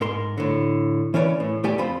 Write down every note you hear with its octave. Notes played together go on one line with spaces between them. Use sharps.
G#2 A#4 C6
A2 D3
E3 C#4 A#4 B4 C#5 D5
A2
C#2 A3 G4 D5 G#5
F2 C4 F4 C5 B5